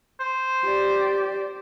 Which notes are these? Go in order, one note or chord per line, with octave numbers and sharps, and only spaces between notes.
C5
G4 D5